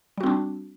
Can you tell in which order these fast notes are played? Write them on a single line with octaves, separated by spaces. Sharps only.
G3 F#4 C4 D4